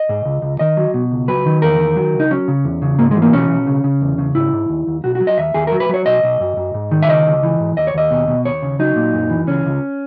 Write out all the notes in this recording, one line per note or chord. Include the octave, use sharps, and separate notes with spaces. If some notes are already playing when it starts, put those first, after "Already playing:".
Already playing: D#5
G#2
C#2
C#2
D#3 D#5
F#3
B2
C#2
F#3 B4
D#3
E2 A#4
D#3
F#3
C#2
D#4
F#3 C#4
C#3
E2
C#3
G#2 A#3
E3 G#3
A#3
B1 C#4
B1
C#3
C#3
E2
C#3
G#2 E4
G#2
D#2
D#2
B1 F#4
F#4
F#3
D#5
D#2 E5
D#2 G#4
F#3 A#4
B4
F#3 C#5
B1 D#5
B1
F#2
F#2
G#2
D#3
E5
C#2 D#5
C#2
E3
G#2
D#2 D#5
C#5
D#2 D#5
B2
B2
D#2 C#5
C#3
F#3 D#4
A#2
F#2
E3
C#2 C#4
C#2